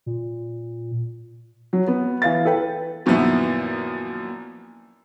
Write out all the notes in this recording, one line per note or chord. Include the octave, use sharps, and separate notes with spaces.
A#2
F#3
B3
E3 F5 A6
A4 B4 G5
F#2 A#2 D#3 F3 B3 E4